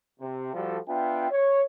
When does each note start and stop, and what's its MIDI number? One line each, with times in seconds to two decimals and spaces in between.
0.20 0.51 48
0.54 0.78 53
0.54 0.78 55
0.54 0.78 66
0.54 0.78 69
0.88 1.30 59
0.88 1.30 62
0.88 1.30 65
0.88 1.30 76
0.88 1.30 79
1.31 1.62 73